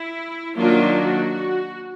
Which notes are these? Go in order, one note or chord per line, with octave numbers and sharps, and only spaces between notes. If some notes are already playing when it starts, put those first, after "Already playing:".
Already playing: E4
D#3 F#3 A#3 D4 F4
F#4